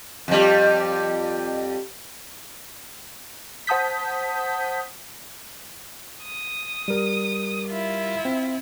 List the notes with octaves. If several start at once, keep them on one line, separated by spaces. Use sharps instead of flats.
F2 G3
C5 F#5 A5 D#6 G6 B6
D#6
G3 A#4
E4 F4
C4